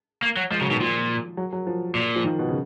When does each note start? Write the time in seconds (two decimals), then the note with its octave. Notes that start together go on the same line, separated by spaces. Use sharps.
0.23 A#3
0.37 F#3
0.50 F3 G#3
0.61 C#3 F#3
0.70 B2 D#3
0.80 A#2 F3
1.37 F#3
1.52 F#3
1.67 F3
1.95 A#2
2.16 F3
2.24 D#3
2.39 B2
2.49 C#3